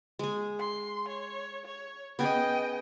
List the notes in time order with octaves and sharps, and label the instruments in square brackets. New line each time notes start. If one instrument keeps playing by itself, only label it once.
[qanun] G#3 G#4
[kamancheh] C6
C#5
C#5
[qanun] B3 C#4 G#4 [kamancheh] D#5 G5